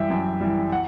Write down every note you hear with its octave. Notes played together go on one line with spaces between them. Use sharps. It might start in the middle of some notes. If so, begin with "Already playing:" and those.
Already playing: F#2 E3 G3 E5 G5
F#2
E3 G3
F#5